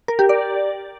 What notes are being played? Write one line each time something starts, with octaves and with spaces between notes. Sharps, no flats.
A#4
G4
D5